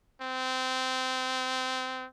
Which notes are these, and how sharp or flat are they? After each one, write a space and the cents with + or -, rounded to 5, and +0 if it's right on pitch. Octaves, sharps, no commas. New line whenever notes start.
C4 -20